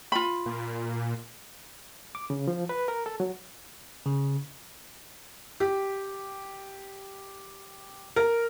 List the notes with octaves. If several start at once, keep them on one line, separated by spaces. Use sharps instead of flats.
F4 B5
A#2
D6
C#3
F3
B4
A#4
A4
F#3
C#3
G4
A#4